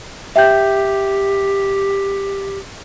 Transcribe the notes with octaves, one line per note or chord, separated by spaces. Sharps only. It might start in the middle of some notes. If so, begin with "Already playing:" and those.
G4 E5 G5 G6